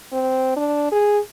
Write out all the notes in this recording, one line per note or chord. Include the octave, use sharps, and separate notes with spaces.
C4
D4
G#4